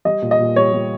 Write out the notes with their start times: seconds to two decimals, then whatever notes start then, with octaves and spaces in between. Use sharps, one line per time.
0.05 G3 D#5
0.22 A#2
0.31 D#5
0.40 A#2
0.56 G3 C#5
0.73 G3